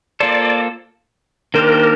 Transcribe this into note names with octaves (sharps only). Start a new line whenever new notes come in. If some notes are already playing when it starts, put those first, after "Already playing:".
A#3 F4 A4 C5 D5
D#3 A#3 D4 G4 A#4 C5